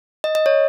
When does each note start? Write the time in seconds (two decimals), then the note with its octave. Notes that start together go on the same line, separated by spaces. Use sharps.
0.24 D#5
0.35 D#5
0.46 C#5